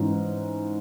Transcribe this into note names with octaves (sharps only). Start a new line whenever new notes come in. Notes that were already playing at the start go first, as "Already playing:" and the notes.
Already playing: G#2 E3 C#4